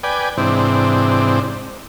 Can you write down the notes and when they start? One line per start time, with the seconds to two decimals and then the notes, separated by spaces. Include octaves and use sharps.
0.04 B4 D5 G5 G#5
0.37 G#2 C3 E3 C4 D4